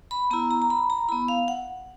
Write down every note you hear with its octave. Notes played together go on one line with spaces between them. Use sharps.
B5
B3 E4 A#5
A#5
A#5
B5
A#5
B3 E4 B5
F5
F#5